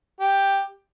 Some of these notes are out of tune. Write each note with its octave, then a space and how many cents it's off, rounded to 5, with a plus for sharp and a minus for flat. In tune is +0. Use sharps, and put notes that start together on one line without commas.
G4 +5